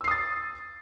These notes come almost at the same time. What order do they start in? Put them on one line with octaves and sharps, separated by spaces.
E6 C7 D#6 A6